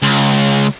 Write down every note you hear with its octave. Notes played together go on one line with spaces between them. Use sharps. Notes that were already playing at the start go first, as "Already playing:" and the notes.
C#2